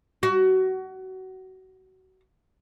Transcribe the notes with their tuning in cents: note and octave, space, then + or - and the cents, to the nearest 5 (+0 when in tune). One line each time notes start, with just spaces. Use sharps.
F#4 +25